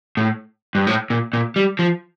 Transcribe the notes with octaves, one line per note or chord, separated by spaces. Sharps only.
A2
G2
A2
A#2
A#2
G3
F3